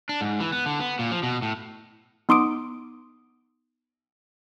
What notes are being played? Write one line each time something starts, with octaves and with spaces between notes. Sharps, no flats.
D4
G#2
E3
B3
D3
B3
A#2
F3
B2
A2
B3 D#4 C6 D6 D#6 D7